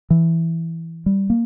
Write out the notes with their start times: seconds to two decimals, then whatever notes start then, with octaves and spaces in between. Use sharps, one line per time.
0.10 E3
1.06 G3
1.30 A#3